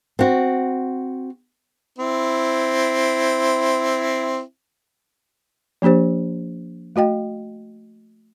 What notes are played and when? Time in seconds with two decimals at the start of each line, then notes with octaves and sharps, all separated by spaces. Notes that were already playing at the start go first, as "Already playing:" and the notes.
0.19 C4 F#4
1.99 C4 E4
5.82 F3 A#3 D4 G4 C5
6.96 A3 F#4 D#5 G5